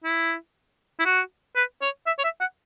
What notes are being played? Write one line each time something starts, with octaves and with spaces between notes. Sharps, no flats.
E4
E4
F#4
B4
C#5
E5
C#5
E5
F#5